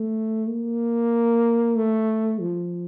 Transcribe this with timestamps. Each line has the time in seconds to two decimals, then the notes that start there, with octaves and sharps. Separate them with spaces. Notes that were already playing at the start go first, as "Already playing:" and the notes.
Already playing: A3
0.48 A#3
1.76 A3
2.40 F3